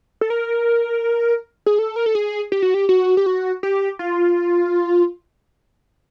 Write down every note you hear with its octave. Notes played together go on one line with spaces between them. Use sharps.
A4
A#4
G#4
A4
A#4
A4
G#4
G4
F#4
G4
F#4
G4
F#4
G4
F4